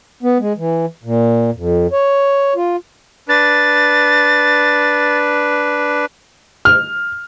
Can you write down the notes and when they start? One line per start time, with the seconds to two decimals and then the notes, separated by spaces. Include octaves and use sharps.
0.23 B3
0.39 G#3
0.57 E3
1.04 A#2
1.54 F2
1.92 C#5
2.55 F4
3.29 D4 B4 A6
6.65 F6